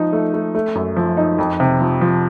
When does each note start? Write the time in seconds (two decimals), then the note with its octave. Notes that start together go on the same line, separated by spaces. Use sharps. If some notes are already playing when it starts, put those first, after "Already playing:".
Already playing: F3 D#4
0.13 A3
0.34 A3
0.55 A3
0.75 F#2
0.96 F3
1.17 D#4
1.38 F2
1.60 C3
1.81 F3
2.01 F3